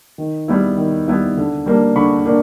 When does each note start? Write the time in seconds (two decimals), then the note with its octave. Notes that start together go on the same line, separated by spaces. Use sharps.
0.18 D#3
0.48 G3 B3 E4
0.77 D#3
1.08 G3 B3 E4
1.37 D3
1.66 G3 A#3 D4
1.96 D3 B5 C#6
2.26 A#3 D4